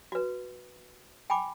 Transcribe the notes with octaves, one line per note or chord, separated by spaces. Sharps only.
F#4 B4
G5 G#5 B5 D6